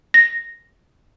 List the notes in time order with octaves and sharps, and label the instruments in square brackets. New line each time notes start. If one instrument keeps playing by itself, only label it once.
[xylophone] A#6